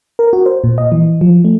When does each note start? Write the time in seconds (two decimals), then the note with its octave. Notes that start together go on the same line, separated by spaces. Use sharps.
0.19 A#4
0.33 F#4
0.46 C5
0.64 A#2
0.78 D#5
0.92 E3
1.21 F3
1.45 A3